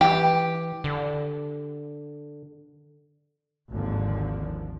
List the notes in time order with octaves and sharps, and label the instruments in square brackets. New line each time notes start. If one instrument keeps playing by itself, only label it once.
[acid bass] E3 [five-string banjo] G4
[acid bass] D3
[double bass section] G#1 D#2 D3 F3